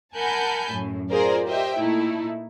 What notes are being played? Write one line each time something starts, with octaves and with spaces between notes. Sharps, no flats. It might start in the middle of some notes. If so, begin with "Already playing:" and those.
A#4 F#5 G#5 A5 B5 G6
F#2 A2
F4 G#4 A#4 C5 D5
G4 C5 D#5 E5 G5
A#2 A3 D#4 E4